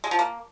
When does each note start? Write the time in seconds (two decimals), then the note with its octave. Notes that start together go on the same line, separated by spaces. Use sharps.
0.04 G#3
0.11 F3
0.19 A#3